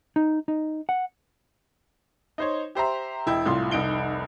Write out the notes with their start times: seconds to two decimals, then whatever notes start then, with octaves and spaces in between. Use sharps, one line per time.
0.16 D#4
0.48 D#4
0.89 F#5
2.38 D#4 C5 C#5
2.75 G4 C5 E5 A#5
3.26 E1 E4 D#5 G5
3.46 C2 A2 F4 C6
3.71 F1 C2 D#4 D7 G7